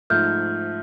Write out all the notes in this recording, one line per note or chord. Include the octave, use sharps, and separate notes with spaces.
G#2 F3 A3 F6 G6